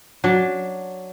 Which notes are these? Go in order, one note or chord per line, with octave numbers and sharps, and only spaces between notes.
F#3 D4